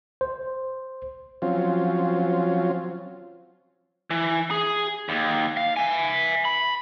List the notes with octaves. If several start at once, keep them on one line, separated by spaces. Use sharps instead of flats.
C5
F3 F#3 C4 C#4 F4
E3
G#4
D#2
F5
E5 G#5
B5